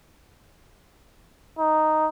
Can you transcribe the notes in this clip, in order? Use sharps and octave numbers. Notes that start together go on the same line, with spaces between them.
D#4